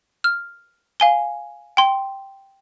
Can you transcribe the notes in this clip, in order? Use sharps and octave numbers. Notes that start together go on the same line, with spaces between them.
F6
F5 G#5 G7
G5 C6